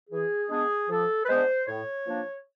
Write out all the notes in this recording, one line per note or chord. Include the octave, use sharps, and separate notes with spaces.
E3 G#4
G#3 B3 D4 G#4
F3 A4
B4
G#3 B3 D4 C5
A2 C#5
F3 A#3 D4